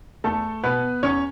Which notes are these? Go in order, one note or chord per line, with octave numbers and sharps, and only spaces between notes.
E2 A3 A4
B2 B3 B4
E2 C#4 C#5